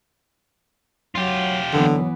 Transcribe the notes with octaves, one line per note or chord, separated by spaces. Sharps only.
F#3 F4 G4
D3 E3 F#3 B3